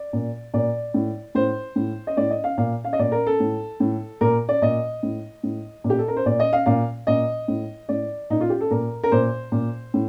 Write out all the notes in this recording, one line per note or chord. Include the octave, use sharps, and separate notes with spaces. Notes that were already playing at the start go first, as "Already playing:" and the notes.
Already playing: D5
A#2
A#2 D5
A2
A2 C5
A2
D#5
A2 D5
D#5
F5
A#2 F5
F5
D#5
A#2 D5
A#4
A4
A2
A2
A#2 A#4
D5
A#2 D#5
A2
A2
A#2
G4
A4
A#4
C5
A#2 D5
D#5
F5
A#2 F5
A#2 D#5
A2
A2 D5
A#2 D#4
F4
G4
A4
A#2 A#4
A#4
A#2 C5
A#2
A2